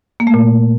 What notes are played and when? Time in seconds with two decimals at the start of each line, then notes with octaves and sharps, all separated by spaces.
0.20 A#3
0.27 A3
0.34 A#2